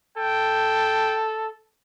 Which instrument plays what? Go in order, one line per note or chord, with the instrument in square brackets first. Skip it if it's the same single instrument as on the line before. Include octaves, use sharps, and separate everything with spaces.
[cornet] A4 [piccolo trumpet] G5